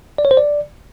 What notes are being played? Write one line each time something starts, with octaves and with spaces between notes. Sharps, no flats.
D5
C#5
C5
D5